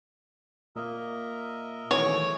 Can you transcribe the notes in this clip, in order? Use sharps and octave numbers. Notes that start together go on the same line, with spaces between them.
A#2 A#3 A#4 D#5 E5
D#3 E3 F#3 A3 G#4 C#5 D6